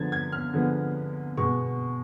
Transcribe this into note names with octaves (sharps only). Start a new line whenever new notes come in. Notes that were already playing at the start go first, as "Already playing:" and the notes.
Already playing: D3 F3 G#3 B3 G#6 A6
G#6
F6
D3 F3 G#3 B3
B2 G#3 B3 C#6